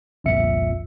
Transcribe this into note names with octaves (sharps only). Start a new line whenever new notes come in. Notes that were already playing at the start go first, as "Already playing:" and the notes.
G1 C2 F2 A#2 E5 C#7